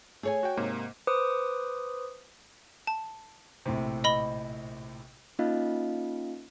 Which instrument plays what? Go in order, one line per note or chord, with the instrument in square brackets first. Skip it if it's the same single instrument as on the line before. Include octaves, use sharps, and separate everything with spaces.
[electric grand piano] A3 [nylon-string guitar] G#4 C#5 G#5
[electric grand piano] F#4 G5
G#2 C3 A#3
[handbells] B4 C5 D6 D#6
[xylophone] A5
[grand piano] A#1 A2 C3
[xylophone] D#5 B5 G7
[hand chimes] A#3 C#4 D#4 F4 D#5 F5